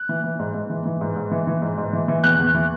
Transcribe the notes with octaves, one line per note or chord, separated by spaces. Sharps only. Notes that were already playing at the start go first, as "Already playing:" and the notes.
Already playing: F#6
E3
E3
G#2
G#2
E3
E3
G#2
G#2
E3
E3
G#2
G#2
E3
E3
E2 F#6
E2
E3